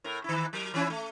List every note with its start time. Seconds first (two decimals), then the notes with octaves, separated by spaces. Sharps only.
0.04 A2 A#4
0.24 D#3 E4
0.53 F#3 A#4
0.74 E3 C#4 E4
0.90 A3